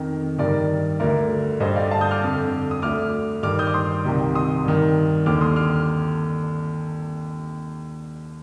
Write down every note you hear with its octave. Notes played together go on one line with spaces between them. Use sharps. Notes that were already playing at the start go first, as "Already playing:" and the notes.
Already playing: F2 D#3 A#4
G2 D#3 A#4 D5
D2 D3 A#4 D5
G2 D3 C5 D#5
D5 F5
F5 A5
D#6 G6
D6 F6
F2 D3
D#6
D2 D3 D6 F6
G2 D#3 D6 F6
D#6 G6
D6
C6 D#6
C2 C3 D#3
C6 D#6
G2 D#3
D#2 D3 D6 F6
C6 D#6
D6 F6